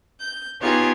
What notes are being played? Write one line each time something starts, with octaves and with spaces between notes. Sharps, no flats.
G6
B3 D#4 F4 G4 G#4 C#5